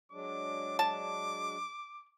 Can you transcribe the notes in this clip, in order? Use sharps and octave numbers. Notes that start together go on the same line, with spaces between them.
F#3 G#3 D4 D6
A5 D6